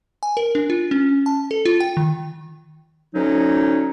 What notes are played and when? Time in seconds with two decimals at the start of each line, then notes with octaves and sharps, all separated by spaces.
0.23 G#5
0.37 A#4
0.55 D4
0.70 F4
0.91 C#4
1.26 A5
1.51 A4
1.65 F4
1.80 G5
1.97 D#3
3.14 D2 F#3 C#4 D#4